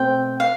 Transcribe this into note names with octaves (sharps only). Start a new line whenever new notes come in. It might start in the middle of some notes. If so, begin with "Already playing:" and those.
Already playing: B2 A3 C4 G5
F5